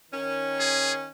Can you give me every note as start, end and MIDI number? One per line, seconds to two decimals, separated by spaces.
0.11 1.09 51
0.11 1.09 61
0.60 0.93 68